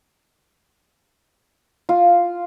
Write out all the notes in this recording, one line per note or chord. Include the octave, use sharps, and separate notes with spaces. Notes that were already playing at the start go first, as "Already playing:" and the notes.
F4